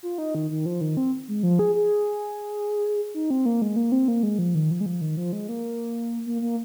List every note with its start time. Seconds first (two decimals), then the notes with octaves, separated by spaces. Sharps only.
0.03 F4
0.18 D#4
0.35 D#3
0.50 D#3
0.66 F3
0.81 D#3
0.97 C4
1.28 G#3
1.43 F3
1.59 G#4
1.75 G#4
3.15 D#4
3.30 C4
3.46 A#3
3.62 G#3
3.76 A#3
3.92 C4
4.08 A#3
4.23 G#3
4.39 F3
4.55 D#3
4.71 F3
4.81 G#3
4.86 F3
5.01 D#3
5.17 F3
5.33 G#3
5.49 A#3
6.26 A#3
6.42 A#3